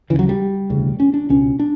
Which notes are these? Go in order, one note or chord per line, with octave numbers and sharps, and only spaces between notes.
D2 C#3 E3
F#3
G3
E1 D2 C#3
C#4
D4
C#2 B2 C#4
D4